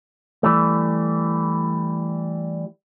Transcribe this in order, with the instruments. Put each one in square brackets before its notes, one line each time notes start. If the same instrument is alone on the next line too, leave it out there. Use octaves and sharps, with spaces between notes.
[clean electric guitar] E3 G3 A3